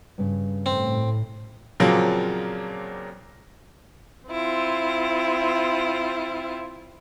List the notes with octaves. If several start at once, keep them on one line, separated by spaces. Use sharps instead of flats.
G2 C#3
A2 C4
A#2 C#3 F3 F#3 A#3 C4
C4 E4 F4